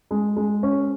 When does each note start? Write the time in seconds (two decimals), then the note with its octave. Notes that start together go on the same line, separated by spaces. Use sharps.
0.11 G#3
0.37 G#3
0.63 C#4